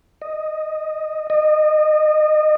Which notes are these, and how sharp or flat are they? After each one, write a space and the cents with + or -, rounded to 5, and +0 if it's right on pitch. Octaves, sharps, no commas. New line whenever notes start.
D#5 -5
D#5 -25